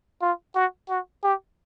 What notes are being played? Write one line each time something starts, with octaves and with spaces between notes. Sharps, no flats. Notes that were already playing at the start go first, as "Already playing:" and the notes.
F4
F#4
F#4
G4